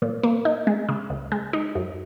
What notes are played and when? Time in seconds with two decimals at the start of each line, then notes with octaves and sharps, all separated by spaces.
0.02 A#2
0.23 A#3
0.45 D#4
0.67 G#3
0.89 C#3
1.10 C#2
1.32 G#3
1.53 D#4
1.75 F#2